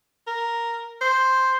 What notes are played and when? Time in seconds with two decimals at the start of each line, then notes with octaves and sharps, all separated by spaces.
0.27 A#4
1.01 C5